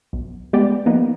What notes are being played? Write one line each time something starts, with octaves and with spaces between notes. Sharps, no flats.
B1
G3 G#3 B3 G4 D5
F3 A#3 B3 D#4